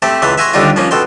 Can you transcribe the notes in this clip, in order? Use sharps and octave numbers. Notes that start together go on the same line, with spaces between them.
A3 C4 G4 A4
C#2 E3 E5 A5 C6
E5 F#5 G#5 A#5 C6 C#6
D#2 D3 G3 D4 D#4 F4
F3 A#3 C#4
B2 A4 G5 C6